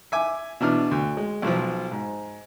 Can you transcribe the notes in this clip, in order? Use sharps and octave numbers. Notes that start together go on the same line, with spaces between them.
E5 G#5 D6
B2 E3 D4 F6
D2
G#3
B1 B2 F3
G#2